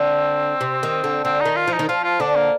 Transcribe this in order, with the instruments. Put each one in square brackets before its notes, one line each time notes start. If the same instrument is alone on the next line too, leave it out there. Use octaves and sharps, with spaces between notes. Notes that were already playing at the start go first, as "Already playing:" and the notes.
Already playing: [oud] D3 [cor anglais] C4
[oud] C3
D#3
D3
[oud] D3 [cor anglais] C4
[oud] D#3 [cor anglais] D#4
[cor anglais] F4
[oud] F3
[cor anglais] D#4
[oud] D#3
[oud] F3 [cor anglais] F4
[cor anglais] F4
[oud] D3 [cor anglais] D4
[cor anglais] A#3